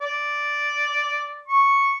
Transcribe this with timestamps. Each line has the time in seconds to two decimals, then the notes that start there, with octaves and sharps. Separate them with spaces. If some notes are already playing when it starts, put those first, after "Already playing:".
0.01 D5
1.48 C#6